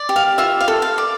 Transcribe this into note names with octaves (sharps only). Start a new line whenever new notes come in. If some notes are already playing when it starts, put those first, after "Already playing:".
Already playing: D5
G4
F5
F4 E5
F5
A4
F5
D5